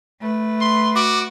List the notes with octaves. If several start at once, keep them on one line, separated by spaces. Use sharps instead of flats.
A3 B4
C6
F#4 D6